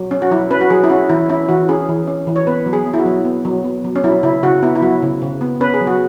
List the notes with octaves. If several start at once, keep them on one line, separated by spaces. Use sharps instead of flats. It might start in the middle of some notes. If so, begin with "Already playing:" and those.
Already playing: F#3
C#4
F#4
F#3 E4
C#4 B4
F#4
F#3 G#4
E4
C#4 F#4
E3 E4
C#4 E4
E3 F#4
C#4 G#4
E3
C#4
E3
C#5
B3 B4
F#3
G#4
B3
E4
F#4
F#3
B3
F#3
B3
F#3
C#4
F#3 E4
C#3 E4
C#3 F#4
B3 E4
E4
F#3 F#4
C#3
C#3
B3
C#4 B4
G#4
F#3
F#4